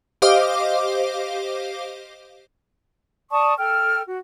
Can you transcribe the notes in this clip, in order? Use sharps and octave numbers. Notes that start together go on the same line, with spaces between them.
G4 C5 D#5 F5 D6
D5 A5 C#6 D#6
A4 G5 F6
F#4